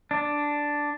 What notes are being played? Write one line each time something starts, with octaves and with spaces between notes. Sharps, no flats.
D4